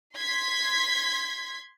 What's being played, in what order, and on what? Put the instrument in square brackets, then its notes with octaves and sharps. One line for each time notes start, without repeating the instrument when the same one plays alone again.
[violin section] C6 G#6 B6